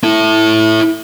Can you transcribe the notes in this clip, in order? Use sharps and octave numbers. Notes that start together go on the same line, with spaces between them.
E4 A4